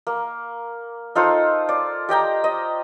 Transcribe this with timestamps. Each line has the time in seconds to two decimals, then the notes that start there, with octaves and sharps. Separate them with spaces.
0.07 A#3
1.15 D#4 F4 A4 C5
1.69 D5
2.09 G4 D#5 G5 A#5
2.44 D#5